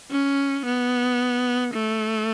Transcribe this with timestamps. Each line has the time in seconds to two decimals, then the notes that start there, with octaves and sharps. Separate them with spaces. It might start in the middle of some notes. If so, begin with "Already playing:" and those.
0.11 C#4
0.65 B3
1.74 A3